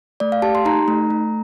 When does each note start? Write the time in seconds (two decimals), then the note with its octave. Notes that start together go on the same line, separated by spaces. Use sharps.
0.20 A3 D5
0.32 F5
0.42 G4 A5
0.55 C6
0.65 D#4 A#5
0.88 A3
1.10 A3